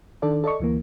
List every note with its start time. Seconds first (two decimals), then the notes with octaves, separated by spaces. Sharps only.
0.22 D#3 D4 A4 D5
0.44 A4 D5 D#5 C#6
0.60 D2 E3 A#3